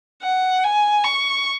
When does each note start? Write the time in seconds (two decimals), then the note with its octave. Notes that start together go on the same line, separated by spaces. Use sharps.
0.22 F#5
0.63 G#5
1.04 C#6